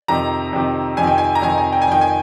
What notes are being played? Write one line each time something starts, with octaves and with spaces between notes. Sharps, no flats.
F2 C3 D#3 A#5
F2 C3 D#3
F2 C3 D#3 G#5
G5
G#5
A#5
F2 C3 D#3 G#5
G#5
G5
G#5
F2 D#3 G5
G#5